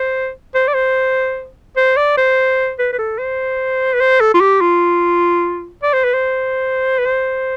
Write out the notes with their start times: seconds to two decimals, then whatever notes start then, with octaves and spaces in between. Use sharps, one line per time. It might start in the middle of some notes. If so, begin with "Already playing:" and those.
Already playing: C5
0.55 C5
0.68 D5
0.74 C5
1.77 C5
1.97 D5
2.17 C5
2.79 B4
2.93 B4
2.99 A4
3.19 C5
3.94 B4
4.00 C5
4.21 A4
4.34 F4
4.41 G4
4.61 F4
5.83 D5
5.93 C5
6.04 B4
6.14 C5
6.99 B4
7.06 C5